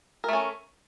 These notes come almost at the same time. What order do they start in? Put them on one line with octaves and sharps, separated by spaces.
A#4 A3 C#4